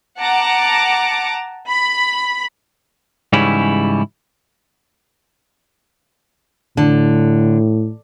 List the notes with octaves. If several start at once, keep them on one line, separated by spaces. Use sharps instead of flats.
F#5 A5 A#5 D6 C#7
B5
G#2 C#3 E3 G3 C#4 E4
A2 D3